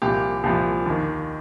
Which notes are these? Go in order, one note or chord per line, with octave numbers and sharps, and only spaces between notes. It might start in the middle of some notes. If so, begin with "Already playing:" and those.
C2 A#2 F3 G4
C2 A#2 F3 G4
D#2 D#3